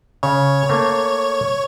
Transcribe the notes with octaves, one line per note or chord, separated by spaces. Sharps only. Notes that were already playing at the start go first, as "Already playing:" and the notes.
C#3 C#5
A3 A#3